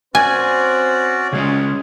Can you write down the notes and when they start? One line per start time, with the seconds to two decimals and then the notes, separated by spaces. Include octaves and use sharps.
0.15 C4 C#4 F#4 C5 D5 G#5
1.33 C#3 G#3 C#4 G#4